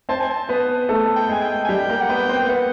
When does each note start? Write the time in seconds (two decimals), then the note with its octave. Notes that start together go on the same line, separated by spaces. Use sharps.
0.09 C4 C5 A5
0.20 G#5
0.30 A5
0.49 B3 B4
0.89 A3 A4
1.16 G5
1.29 G#3 G#4 G#5
1.42 G5
1.65 G#5
1.69 G3 G4 G5
1.89 A#3 A#4
2.01 F#5
2.09 B3 B4 G5
2.29 C4 C5
2.49 B3 B4 F#5